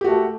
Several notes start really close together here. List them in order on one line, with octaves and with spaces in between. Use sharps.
G4 F#4 A3 A4